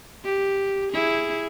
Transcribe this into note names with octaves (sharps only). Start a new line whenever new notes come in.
G4
E4 G#4